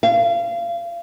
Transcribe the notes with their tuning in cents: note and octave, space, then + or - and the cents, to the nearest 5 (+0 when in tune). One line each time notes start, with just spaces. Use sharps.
F5 -30